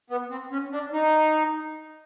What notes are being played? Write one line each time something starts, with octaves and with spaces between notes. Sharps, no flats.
B3
C4
C#4
D4
D#4